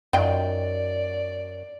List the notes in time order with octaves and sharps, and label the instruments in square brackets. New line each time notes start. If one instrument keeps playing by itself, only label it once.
[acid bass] F#2 [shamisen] D#3 F4 G5 [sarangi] D5